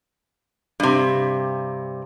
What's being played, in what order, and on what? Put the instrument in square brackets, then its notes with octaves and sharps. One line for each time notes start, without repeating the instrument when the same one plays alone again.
[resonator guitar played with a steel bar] G2 C3